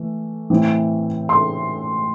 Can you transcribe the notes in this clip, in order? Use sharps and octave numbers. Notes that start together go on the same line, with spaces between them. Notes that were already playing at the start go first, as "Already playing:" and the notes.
Already playing: E3 A3
A2 E3 C4
C6